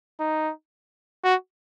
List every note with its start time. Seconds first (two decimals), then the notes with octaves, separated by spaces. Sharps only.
0.20 D#4
1.24 F#4